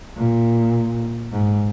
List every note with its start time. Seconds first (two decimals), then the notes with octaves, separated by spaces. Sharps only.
0.17 A#2
1.32 G#2